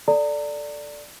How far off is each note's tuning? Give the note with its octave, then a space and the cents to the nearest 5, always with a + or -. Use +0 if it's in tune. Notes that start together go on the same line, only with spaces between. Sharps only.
A4 +0 D5 +0 A#5 -35